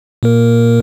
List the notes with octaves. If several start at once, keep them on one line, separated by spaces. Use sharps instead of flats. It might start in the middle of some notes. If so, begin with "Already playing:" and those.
A#2 A#3 A#4